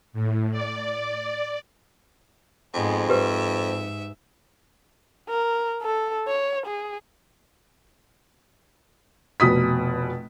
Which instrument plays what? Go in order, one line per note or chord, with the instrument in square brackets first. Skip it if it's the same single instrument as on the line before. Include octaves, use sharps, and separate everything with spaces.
[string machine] A2
D5
[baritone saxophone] F2 [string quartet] G#2 G#3 B3
[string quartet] G#2 E5 [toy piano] G4 B4 C5
[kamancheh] A#4
A4
C#5
G#4
[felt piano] F1 B2 D#6 B6